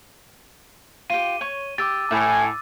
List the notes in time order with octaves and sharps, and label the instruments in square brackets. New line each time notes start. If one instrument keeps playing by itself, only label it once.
[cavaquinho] F4 G4 [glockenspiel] D#7 G7
[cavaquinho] C#5 C#6
[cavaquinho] G4 [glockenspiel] D6 E6 A6
[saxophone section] A2 [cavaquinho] E5 [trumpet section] G#5